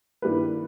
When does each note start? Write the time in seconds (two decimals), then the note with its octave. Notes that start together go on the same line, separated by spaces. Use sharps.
0.22 G2 D#3 G3 A#3 E4 B4